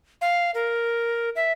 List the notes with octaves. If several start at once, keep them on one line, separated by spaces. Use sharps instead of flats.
F5
A#4
E5